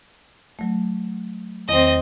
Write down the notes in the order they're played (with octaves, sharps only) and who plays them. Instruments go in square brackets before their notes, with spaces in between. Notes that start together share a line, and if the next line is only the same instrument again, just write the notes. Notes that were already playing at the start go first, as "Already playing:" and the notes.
[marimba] F#3 A3
[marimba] E2 D#3 [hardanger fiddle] C4 D#5